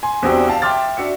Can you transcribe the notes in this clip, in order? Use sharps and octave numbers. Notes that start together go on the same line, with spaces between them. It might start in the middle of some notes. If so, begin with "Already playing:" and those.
G#5 C6
E2 C4 D4 F#4 G4
F5 A5
E5 G5 C6 D6 F6 A6
D4 F#4 E5 C#7